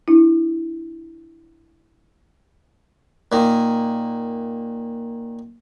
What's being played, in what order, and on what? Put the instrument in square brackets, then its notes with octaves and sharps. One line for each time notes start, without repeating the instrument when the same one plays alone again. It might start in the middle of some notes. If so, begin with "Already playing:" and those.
[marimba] D4 E4
[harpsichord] A#2 D#3